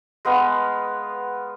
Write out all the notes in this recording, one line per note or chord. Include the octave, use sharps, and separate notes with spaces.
G#3 B3 B4 F5